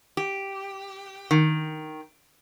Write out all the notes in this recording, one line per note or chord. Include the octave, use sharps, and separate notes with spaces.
G4
D#3